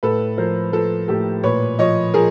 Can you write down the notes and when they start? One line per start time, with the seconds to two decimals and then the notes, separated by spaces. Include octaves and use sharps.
0.03 A2 A4 B4
0.38 F3 A#4 C5
0.73 F3 A4 B4
1.08 A2 G4 A4
1.44 A#2 B4 C#5
1.79 F3 C#5 D#5
2.14 F3 G#4 A#4